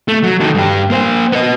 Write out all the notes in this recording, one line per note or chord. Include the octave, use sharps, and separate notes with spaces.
A3
F#3
D#3 A4
G2 G4
A#3 C5
B3 D#5